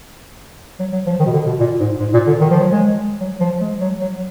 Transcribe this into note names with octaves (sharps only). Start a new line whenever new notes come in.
F#3
F#3
F3
D#3
B2
D3
B2
A#2
G#2
G#2
A#2
D3
D#3
F3
F#3
G#3
F#3
F3
G#3
F#3
F#3